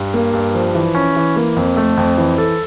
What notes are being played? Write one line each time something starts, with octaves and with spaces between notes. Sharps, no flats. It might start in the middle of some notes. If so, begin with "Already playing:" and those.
Already playing: G2
A#3
G2
F3
E3
C#4
E3
A#3
F2
A3
F2
E3
A4